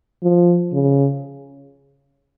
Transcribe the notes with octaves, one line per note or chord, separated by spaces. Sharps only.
F3
C#3